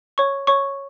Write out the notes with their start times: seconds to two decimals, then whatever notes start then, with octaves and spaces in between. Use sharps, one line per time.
0.18 C#5 C#6
0.47 C#5 C#6